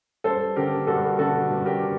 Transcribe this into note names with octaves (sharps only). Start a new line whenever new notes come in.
G2 A4 C5
D3 G4 A#4
G2 F#4 A4
D3 F#4 A4
G2
G4 A#4
D3